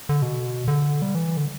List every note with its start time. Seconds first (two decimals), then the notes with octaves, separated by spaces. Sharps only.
0.09 D3
0.22 B2
0.68 D3
1.02 G3
1.15 E3
1.37 D3